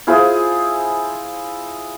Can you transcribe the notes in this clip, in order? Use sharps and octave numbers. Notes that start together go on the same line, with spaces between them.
E4 F4 G#4 C5